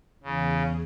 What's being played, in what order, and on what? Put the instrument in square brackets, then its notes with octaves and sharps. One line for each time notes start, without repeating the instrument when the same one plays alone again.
[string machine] E2 G#4 [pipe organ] C#3